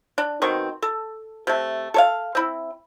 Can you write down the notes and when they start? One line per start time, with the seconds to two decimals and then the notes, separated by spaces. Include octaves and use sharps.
0.18 D4
0.42 B2 D#3 C4 C#6
0.82 A4
1.47 C3 A3
1.94 A4 C#5 F5
2.35 C4 E4